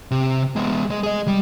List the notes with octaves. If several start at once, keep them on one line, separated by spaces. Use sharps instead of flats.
C3
G#3 B3
G#3
G#4 D#5
G3